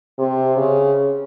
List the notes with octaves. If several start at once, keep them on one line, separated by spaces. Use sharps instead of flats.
C3
C#3